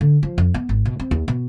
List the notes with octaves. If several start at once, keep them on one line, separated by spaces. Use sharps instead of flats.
D3
F3
F2
B3
G#1
B2
C4
D#2
B2